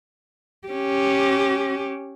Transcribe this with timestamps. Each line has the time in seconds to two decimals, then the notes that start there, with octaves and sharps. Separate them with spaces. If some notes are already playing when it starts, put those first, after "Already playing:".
0.67 C#4 G4